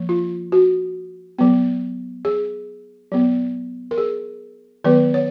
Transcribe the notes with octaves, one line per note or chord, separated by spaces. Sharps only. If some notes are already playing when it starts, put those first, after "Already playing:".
Already playing: F3 A#3
F4
F#4
F#3 B3
G#4
F#3 B3
A#4
G#4
D#3 F#3 B3 B4
C#5